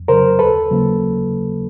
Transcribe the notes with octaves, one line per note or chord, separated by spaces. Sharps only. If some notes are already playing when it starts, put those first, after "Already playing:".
Already playing: F2
C#3 F#3 A#4 C5
D#2 A4 B4
C#3 F#3 A#3